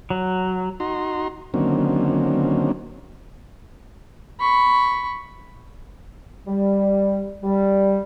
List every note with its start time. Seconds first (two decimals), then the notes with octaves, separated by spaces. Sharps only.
0.10 F#3
0.80 D#4 F#4 A#5 C6
1.54 D3 D#3 F#3 A#3 C4 C#4
4.40 B5 C#6
6.48 G3
7.44 G3